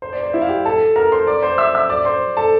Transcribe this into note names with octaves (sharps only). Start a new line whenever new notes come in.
C5
D5
C5
E4 E5
F5
G4 G5
A4 A5
A#4 A#5
C5 C6
D5 D6
C5 C6
E5 E6
E5 E6
D5 D6
C5 C6
A4 A5